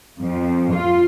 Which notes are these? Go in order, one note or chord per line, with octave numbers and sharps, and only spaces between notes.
F2
F4